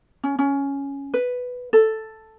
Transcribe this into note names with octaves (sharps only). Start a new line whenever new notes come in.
C#4
C#4
B4
A4